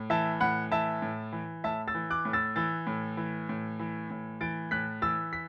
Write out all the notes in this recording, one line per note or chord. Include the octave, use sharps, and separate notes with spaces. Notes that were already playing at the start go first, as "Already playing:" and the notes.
Already playing: A2
E3 E5 A5
A2 F#5 B5
E3 E5 A5
A2
E3
A2 E5 A5
E6 A6
E3
D6 F#6
A2
E6 A6
E3 E6 A6
A2
E3
A2
E3
A2
E3 A6 D7
A2 F#6 B6
E3 E6 A6
B6